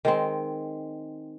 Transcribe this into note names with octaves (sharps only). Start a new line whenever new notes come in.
D#3 G#3 C4